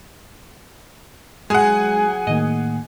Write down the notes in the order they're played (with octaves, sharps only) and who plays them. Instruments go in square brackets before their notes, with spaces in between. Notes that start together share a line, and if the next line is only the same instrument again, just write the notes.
[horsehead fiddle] F#3 G#5 [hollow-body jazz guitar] G#3 [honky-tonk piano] G#4 F#5
[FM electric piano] A2 D#3 A#3 [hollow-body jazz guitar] D#5